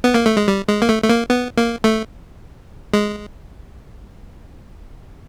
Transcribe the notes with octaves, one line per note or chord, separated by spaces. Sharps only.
B3
A#3
A3
G#3
G3
G#3
A#3
A3
A3
A#3
B3
A#3
A3
G#3